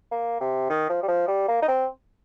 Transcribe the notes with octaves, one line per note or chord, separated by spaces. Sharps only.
A#3
C3
D#3
F3
G3
F3
G3
A#3
D#4
C4